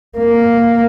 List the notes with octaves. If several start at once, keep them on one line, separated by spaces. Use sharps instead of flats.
A#3